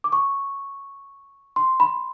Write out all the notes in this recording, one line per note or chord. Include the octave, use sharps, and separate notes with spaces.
D6
C#6
C6
B5